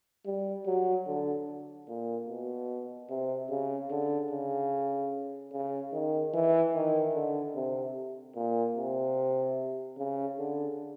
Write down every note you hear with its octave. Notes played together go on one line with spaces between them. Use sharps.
G3
F#3
D3
A#2
B2
C3
C#3
D3
C#3
C#3
D#3
E3
D#3
D3
C3
A#2
C3
C#3
D3